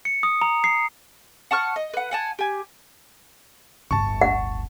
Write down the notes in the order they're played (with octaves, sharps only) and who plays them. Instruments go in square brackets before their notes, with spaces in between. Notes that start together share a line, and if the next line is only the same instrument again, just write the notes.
[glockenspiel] C#7
D#6
A#5
C7
[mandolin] F#5 A5 C#6 F6
D#5
B4 F#5
F#5 G#5 A5
G4 G#5
[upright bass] D1 G1 [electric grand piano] A5 C#6
[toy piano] F#5